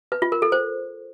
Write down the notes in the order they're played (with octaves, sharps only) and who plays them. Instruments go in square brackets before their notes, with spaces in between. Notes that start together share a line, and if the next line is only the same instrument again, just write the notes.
[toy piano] B4
F4
A#4
A4
C5